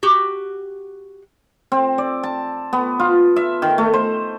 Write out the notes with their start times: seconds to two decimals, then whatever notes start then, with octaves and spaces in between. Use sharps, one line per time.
0.03 F#4 G4
1.72 C4
1.98 D5
2.23 A5
2.73 B3
2.99 F4
3.36 E5
3.62 D#3
3.78 A3
3.93 C5